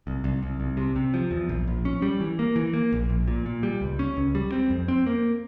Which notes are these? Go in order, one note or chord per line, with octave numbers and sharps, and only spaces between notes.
C2
C2
C2
C2
C3
C3
F3
E2
A#1
A#1
C#4
G3
E3
A#3
E3
A#3
A#1
A#1
A#2
A#2
G3
C#2
C#4
C#2
G3
C4
F2
C4
A#3